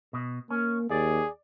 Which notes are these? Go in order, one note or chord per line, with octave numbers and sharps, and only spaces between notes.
B2
A#3 C#4
D#2 G#4 D5